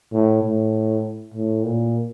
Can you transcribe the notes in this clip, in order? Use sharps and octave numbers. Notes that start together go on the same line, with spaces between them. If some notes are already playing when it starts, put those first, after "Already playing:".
A2
A2
A2
A#2